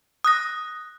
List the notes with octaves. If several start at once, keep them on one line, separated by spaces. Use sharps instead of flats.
D#6 F#6 A#6